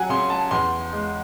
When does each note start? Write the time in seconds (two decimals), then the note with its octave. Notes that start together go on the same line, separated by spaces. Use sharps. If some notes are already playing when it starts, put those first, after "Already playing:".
Already playing: F#3 F#5 G#5
0.09 C#3 C6
0.30 A5
0.51 E2 C6
0.92 G#3